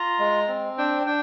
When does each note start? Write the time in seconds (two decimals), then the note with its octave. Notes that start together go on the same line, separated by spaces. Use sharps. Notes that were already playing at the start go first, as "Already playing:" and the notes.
Already playing: F4 A#5
0.19 G#3
0.48 C4
0.78 D4 G5
1.06 D4 G5